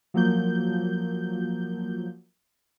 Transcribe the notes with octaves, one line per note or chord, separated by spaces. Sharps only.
F3 F#3 A#3 G6